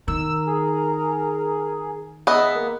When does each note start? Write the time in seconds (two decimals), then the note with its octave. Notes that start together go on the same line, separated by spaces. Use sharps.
0.08 D#3 A#4 E6
0.46 G#4
2.27 G#3 B3 D#5 E5
2.55 A#3